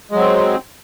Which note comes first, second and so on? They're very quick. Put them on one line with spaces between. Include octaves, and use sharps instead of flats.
G#3 F#3 C4